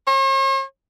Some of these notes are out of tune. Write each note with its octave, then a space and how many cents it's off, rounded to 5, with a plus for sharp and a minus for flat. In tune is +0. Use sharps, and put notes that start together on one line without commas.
C#5 -45